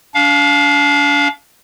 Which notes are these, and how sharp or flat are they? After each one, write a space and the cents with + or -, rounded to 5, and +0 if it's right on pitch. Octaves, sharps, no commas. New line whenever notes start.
D4 -40 F5 +0